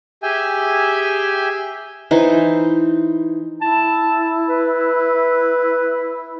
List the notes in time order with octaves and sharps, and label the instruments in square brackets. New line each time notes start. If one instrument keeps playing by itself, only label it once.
[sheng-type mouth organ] G4 G#4 E5 G5 G#5
[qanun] E3 D#4 C5
[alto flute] E4 [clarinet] A5
[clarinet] B4